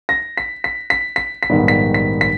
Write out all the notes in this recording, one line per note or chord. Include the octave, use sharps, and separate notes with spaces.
A#6
B6
B6
B6
B6
B6
A#1 G#2 D#3 G3 B3
B6
B6
B6